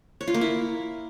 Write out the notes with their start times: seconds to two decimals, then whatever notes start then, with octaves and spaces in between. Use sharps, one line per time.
0.21 C#5
0.27 F4
0.34 A#3
0.41 E4